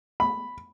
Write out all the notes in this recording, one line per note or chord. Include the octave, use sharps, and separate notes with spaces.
B5